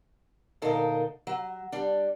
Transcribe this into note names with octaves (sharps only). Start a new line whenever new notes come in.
D2 A#2 D#4 A4 A#4 F5
F#3
G3 D4